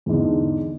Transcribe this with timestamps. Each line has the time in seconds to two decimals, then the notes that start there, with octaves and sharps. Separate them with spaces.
0.06 E2
0.09 G#2
0.12 D3